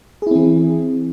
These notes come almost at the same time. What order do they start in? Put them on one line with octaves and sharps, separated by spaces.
G#4 E4 C4 E3